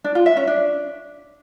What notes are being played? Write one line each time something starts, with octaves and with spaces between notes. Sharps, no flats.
D4
F4
E5
C#4
D4